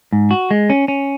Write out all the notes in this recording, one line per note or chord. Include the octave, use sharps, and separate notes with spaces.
G#2
F#4
G#3
C#4
C#4